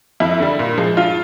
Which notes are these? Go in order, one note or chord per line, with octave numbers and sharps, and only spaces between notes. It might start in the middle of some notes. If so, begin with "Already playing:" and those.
F2 E4
D3 G3
A#2
F3 G#3
G2 F4